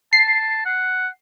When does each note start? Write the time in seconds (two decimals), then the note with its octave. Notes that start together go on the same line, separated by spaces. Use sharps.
0.13 A5 C7
0.66 F#5